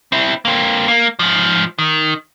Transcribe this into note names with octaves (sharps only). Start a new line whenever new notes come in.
C4 E4
A#3 C4
A#3
G#2 F3
D#3